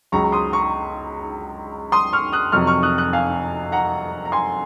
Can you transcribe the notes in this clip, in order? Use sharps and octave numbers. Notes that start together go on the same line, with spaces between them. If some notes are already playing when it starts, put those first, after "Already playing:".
C#2 C#3 F#3 A#5 C#6
C#6
C6 D#6
A#5 C#6
C6 D#6
C#6 F6
D#6 F#6
F2 C3 F#3 C#6 F6
C#6 F6
D#6 F#6
D#6 F#6
F5 G#5
F#5 A#5
A#5
G#5 C6